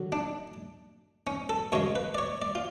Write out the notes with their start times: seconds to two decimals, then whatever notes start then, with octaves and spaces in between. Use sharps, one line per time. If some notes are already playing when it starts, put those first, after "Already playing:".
Already playing: D3 F#3
0.12 D4
1.27 C#4
1.49 A4
1.72 F#2 C#3 G#3 C#5
1.96 B4
2.15 D5
2.18 C#5
2.42 D5
2.55 F4